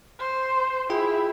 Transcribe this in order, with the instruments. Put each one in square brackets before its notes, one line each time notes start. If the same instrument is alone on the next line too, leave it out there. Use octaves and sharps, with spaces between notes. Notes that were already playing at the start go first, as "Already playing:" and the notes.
[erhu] C5
[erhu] E4 [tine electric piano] F4 G#4 G5